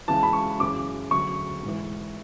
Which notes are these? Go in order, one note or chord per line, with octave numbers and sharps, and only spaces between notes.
C#2 C#3 E3 A5
B5
C#6
F#2 C#3 E3 D6
D2 C#3 F#3 C#6
G#2
E3